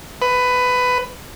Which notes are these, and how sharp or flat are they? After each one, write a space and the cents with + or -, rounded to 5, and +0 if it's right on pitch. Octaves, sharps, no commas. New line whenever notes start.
B4 +15